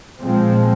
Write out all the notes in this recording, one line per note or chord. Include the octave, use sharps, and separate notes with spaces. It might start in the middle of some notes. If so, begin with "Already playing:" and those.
A#2 F3 G#3 C4